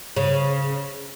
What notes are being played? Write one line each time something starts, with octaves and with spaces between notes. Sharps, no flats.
C#3